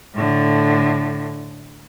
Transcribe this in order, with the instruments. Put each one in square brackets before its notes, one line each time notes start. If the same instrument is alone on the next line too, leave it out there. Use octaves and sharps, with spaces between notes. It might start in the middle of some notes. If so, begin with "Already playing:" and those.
[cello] A2 D3